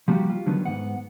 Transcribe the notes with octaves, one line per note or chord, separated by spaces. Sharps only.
F3 G3 A#3 B3 F#4 G4
F4
D3 D#3 F#3 B3
G#2 B3 F#5